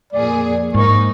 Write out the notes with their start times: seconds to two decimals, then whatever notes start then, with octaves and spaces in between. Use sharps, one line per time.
0.13 F2 A#2 G#4 D5
0.74 G#2 A#3 D#4 C#6